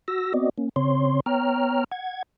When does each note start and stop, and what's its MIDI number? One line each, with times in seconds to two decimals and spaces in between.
0.08 0.33 66
0.08 0.33 88
0.08 0.33 94
0.34 0.49 59
0.34 0.49 60
0.34 0.49 66
0.34 0.49 74
0.34 0.49 75
0.58 0.69 58
0.58 0.69 61
0.76 1.20 49
0.76 1.20 60
0.76 1.20 73
0.76 1.20 84
1.26 1.84 59
1.26 1.84 73
1.26 1.84 79
1.26 1.84 82
1.26 1.84 89
1.92 2.23 78
1.92 2.23 92